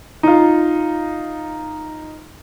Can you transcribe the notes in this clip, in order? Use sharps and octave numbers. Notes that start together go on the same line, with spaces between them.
D#4 F4